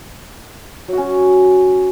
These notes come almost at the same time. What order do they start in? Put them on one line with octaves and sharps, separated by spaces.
F#3 F#4 C#4